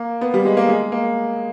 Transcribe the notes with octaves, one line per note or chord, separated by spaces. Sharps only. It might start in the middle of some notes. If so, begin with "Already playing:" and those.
Already playing: A#3
B3
G3
G#3
A#3
G#3
A#3